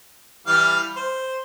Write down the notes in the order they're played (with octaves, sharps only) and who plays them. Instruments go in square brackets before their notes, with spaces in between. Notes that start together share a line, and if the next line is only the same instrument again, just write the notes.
[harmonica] E3 G3 F5
C5